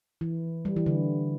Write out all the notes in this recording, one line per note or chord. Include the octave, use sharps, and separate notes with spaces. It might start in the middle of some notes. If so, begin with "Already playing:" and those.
E3
G3
E3
D3